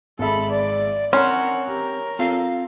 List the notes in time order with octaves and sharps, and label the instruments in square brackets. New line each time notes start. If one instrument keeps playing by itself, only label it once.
[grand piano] G#1 G#3 E5 [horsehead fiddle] A4 B5
[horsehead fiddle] D5
[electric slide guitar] C4 [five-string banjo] C#4 [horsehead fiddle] A#4 F#5 [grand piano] B5 C6
[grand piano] G4 [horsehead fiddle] A#4
[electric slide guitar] C4 F4 F5 [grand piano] A4